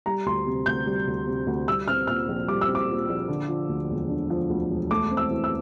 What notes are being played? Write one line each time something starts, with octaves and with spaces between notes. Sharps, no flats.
G3 A#5
D2 C6
C3
D2 G6
G3
D2
C3
D2
G3 E6
C4 F6
A#2 F6
A#1
G3 D6
E6
C4
D6
A#2
A#1
D3
F3
D2
E1
D3
F3
D2
E1
A3 D6
C4
E6
E3
E6